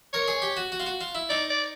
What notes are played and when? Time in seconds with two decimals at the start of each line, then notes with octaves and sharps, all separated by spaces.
0.13 A#4 C#5
0.28 G#4
0.42 G4
0.57 F#4
0.72 F#4
0.80 F4
0.86 F#4
1.01 F4
1.15 E4
1.29 D#4 D5
1.50 D5